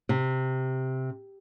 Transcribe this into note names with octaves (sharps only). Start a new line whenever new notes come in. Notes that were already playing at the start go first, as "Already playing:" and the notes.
C3